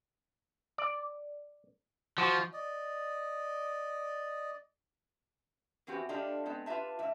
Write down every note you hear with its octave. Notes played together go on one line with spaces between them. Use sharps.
D5
F3 F#4
D5 D#5
E2 E3 C4 F#4 G4 F#5
G3 A3 D4 F4 G4 D#5
G#3 B3 C4
F4 G4 B4 E5 A5
G#2 E5